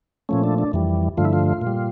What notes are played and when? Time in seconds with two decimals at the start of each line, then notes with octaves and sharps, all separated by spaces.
0.29 A#2 F3 A3 C#4
0.43 D4
0.58 D4
0.73 F2 E3 G3
1.17 G2 D3 F3 A3 F4
1.25 E4
1.33 F4
1.61 A#2
1.67 G3